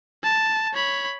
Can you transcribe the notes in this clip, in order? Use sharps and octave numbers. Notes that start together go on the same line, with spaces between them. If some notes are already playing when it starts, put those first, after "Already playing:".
A5
C#5 B5